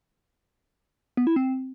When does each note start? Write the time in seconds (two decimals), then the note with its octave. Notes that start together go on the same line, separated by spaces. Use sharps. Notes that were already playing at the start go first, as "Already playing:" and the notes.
1.17 B3
1.27 E4
1.36 C4